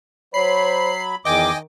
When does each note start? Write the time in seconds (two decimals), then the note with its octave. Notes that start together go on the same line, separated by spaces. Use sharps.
0.34 F#3 C5 C#5 B5 C7
1.25 E2 D#3 D#5 G5 G#5 D6